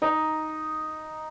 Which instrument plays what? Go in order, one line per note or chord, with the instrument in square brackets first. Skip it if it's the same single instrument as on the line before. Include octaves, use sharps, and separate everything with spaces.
[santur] D#4